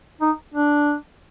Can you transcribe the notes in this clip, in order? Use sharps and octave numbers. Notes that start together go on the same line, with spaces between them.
D#4
D4